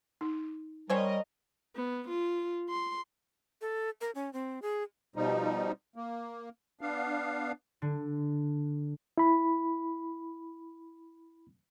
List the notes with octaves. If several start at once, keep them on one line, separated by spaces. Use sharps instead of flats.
D#4
G3 C#4 A#4 C5 C#5 D#5
B3
F4
C6
A4
A#4
C#4
C4
G#4
B2 F3 G3 D#4
A#3
B3 D4 F5
D3
E4 B5